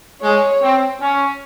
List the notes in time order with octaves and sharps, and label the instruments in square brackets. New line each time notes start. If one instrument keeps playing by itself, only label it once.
[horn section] G#3 [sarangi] C#5
[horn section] C4
C#4